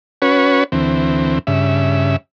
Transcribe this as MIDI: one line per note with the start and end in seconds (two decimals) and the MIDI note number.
0.22 0.64 61
0.22 0.64 66
0.22 0.64 71
0.22 0.64 73
0.72 1.39 38
0.72 1.39 52
0.72 1.39 60
1.47 2.16 43
1.47 2.16 49
1.47 2.16 76